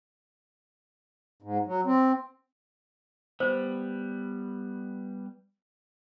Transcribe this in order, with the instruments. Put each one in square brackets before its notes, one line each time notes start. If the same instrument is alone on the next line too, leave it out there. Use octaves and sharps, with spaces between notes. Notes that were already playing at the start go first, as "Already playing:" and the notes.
[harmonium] G#2
F#3
C4
[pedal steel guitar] G3 B3 [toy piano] C5